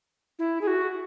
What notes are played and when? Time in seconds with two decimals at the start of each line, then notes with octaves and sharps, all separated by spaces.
0.39 E4
0.61 G#4
0.67 F#4